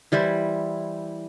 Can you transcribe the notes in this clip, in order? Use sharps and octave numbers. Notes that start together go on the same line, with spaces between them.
E3 G3 E4 C5